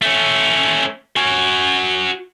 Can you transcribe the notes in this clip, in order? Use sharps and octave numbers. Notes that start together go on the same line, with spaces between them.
A3 C#4
F#4 G#5